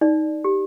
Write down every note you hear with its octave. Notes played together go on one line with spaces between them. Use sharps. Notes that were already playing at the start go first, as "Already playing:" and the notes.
D#4 D5
G4